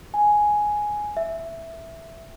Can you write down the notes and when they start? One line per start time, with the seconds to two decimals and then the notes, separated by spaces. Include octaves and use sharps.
0.14 G#5
1.17 E5